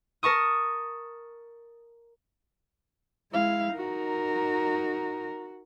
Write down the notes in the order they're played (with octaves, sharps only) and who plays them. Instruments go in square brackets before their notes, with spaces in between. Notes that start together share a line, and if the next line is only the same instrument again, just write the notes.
[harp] A#4 A5 C#6 D#6
[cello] G#3 [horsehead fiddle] E4 F5
[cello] D#4 A#4 [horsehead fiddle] F#4